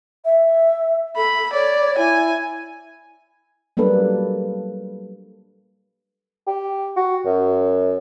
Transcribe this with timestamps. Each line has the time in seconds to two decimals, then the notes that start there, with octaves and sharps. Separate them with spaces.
0.25 E5
1.17 A4 B5
1.53 C#5 D5
1.98 E4 G#5
3.77 F#3 G3 A#3 D4 A4 B4
6.47 G4
6.96 F#4
7.25 F#2